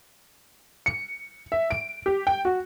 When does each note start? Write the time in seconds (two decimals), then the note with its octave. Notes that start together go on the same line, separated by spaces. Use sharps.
0.86 C#7
1.52 E5
1.71 D7
2.06 G4
2.27 G5
2.45 F#4